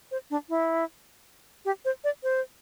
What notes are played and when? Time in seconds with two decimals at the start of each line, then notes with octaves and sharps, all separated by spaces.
0.11 C5
0.30 D4
0.49 E4
1.65 G4
1.85 C5
2.04 D5
2.23 C5